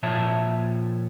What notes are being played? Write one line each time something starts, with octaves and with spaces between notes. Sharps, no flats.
A#2 F3 C#5 E5 A5